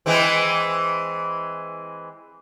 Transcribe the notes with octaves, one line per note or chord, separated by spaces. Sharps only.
E3 G#3 C4